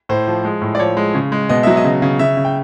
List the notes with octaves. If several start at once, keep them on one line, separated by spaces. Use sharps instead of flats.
A2 C5
F3
G#3
A2
D5
F3 C#5
G#3
C#3
G#3
B2 D#5
F#3 E5
D#5
C#3
C#3
C#3 E5
C#3
G5